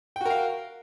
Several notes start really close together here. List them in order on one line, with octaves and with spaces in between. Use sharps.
G5 F#4 A#4 F5